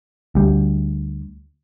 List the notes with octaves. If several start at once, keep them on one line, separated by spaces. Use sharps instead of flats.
D2 G3